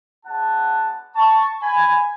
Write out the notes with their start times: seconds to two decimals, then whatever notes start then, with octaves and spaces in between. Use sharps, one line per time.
0.25 G#3 B3 D4 F#4 F#5 A5
1.16 A5 C#6
1.62 G#5 B5